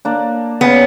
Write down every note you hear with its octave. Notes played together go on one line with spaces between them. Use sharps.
A#3 D4
C#3 B3 G#5